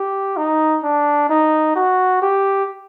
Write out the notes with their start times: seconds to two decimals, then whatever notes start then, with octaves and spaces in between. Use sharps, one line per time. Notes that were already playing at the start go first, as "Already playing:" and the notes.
Already playing: G4
0.37 D#4
0.83 D4
1.29 D#4
1.76 F#4
2.22 G4